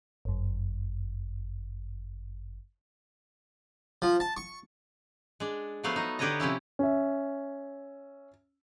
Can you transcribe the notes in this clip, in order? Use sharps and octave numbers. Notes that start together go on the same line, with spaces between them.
G1 F#2
F3
A5
C#6
G#3 D4
F3 F#3 A3 B3 C5 F5
D#4
D3 G4 B4 C#5 D#5 A#5
C3 F3 C#4 E4
C#4 E5